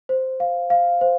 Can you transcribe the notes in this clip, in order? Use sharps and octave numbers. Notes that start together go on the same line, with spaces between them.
C5
F5
F5
C5